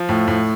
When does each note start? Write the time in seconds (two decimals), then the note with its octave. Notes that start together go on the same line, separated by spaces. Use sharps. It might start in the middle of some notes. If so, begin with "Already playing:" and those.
Already playing: F3
0.09 A2
0.28 A2